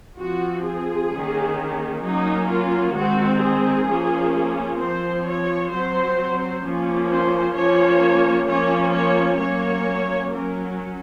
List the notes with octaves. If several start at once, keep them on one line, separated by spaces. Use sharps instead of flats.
F3 C4 F#4
G#4
D#3 A#3 C#4
F#3 A#3 C#4 D#4
F4
D#3 G#3 C4 F#4
G#4
F3 A#3 C#4
F3 C4 C5
C#5
F#3 C4 C5
F3 A#3 C#4
C5
F3 A#3 C#4 C#5
F3 A#3 C#4 C#5
C#5
F#3 A#3 C#4 C#5
F#3 C#4 A#4